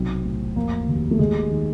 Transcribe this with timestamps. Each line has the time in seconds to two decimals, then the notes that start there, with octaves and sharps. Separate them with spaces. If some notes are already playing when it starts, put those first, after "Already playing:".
Already playing: B1 C3 C4
0.25 A2
0.56 F1 A#3
0.88 D#2
1.11 A3
1.19 D#2 G#3
1.51 D#3